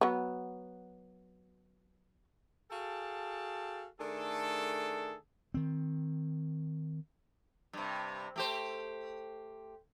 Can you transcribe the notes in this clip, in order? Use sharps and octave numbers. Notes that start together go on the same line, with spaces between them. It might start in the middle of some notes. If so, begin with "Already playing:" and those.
F#3 B3
F#4 G#4 A4 F5 G5 A5
D#3 A3 D4 G#4 A4
D#3 C4
G2 C3
A3 G4 C5